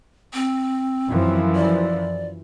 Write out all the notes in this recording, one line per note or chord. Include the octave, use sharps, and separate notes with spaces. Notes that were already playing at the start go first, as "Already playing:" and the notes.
C4
F#2 E3 F3
D5